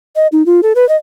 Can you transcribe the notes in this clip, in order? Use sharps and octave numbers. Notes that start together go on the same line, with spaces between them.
D#5
D#4
F4
A4
B4
D#5